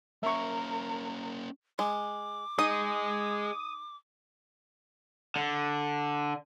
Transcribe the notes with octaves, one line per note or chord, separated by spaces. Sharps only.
A#3 C#4 A#4 E5 C#6
G#3 D6
D#4 G#4 D#5 D#6
D3